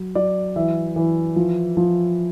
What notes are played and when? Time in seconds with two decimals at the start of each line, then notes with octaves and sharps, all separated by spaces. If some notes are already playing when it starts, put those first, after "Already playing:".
Already playing: F#3
0.15 F#3 D5
0.56 E3 E5
0.96 E3
1.36 F3
1.77 F3